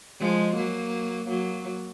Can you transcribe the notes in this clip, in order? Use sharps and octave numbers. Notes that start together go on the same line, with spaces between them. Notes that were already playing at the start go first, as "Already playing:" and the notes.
F3 G#3
F#3 A#3
F#3 A#3